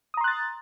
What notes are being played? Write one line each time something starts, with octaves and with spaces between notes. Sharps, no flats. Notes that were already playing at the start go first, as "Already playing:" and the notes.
A#5 C6 D#6 F#6 A6